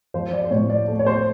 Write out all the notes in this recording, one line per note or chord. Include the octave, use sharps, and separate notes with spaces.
F3 C5
D5
C5
A2 C#5
D5
A3
C#5
C5